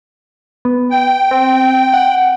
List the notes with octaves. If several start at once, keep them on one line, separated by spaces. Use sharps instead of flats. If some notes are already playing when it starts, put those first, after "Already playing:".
B3
G5
C4
F#5